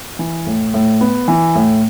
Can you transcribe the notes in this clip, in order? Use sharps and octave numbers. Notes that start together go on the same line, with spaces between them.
E3
A2
A2
B3
E3
A2